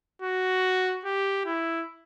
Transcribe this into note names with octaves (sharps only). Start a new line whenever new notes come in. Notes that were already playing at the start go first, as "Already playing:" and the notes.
F#4
G4
E4